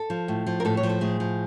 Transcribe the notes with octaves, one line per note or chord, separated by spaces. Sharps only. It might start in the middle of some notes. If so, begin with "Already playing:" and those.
Already playing: A4
F3
A2
F3
A#4
A2 A4
C#5
F3
A4
A2 G#4
F3